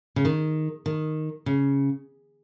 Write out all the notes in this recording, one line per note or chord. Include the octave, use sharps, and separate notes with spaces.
C#3
D#3
D#3
C#3